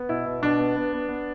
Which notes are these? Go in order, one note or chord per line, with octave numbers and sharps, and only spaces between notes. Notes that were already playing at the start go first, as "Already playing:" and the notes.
Already playing: B3
B2 E4
B2
B2 D4
B3
B3
B3
B3